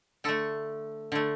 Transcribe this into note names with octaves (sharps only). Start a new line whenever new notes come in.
D3 A3 A4
D3 A3